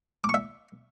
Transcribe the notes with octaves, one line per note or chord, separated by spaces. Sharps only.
D6
C#6
E5